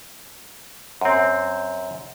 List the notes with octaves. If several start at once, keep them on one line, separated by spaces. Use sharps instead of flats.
F#2 C4